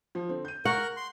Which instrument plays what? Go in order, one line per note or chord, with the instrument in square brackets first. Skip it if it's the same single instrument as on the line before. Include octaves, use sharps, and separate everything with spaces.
[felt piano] F3
D3 C4
G6 D#7
[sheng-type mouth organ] A#4 [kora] F#5 [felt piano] C#6
[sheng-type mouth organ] C6